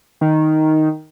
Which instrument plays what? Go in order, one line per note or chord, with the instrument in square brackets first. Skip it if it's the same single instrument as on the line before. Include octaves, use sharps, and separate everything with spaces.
[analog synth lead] D#3